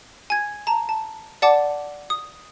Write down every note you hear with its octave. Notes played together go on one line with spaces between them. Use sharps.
G#5 G#6
A5 A#5
A5
D5 F#5 A5 D6
D#6